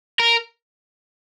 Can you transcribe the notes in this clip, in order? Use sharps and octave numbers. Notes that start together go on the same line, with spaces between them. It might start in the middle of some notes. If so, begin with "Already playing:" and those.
A#4